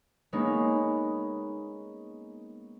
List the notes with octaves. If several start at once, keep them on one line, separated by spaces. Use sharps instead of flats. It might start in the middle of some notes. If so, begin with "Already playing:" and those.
G#3 A#3 B3 C#4 D#4